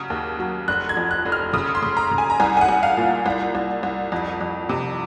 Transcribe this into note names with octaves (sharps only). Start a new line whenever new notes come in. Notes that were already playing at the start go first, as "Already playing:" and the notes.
Already playing: C#3 F#3
D#2
F#3
F1 F#6
G#6
F2
F#6
F1
F6
C#3 D#6
C6
C#3
A#5
C#3
G#5
A#5
C2 G#5
G#5
F#5
C2
F5
A#2
C2
C2
C2
F2
F2
C3